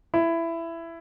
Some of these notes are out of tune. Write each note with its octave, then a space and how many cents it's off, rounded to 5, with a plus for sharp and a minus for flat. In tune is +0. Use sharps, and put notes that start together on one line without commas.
E4 +15